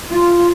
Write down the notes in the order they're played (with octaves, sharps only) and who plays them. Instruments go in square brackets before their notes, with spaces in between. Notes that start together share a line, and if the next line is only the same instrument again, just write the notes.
[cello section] F4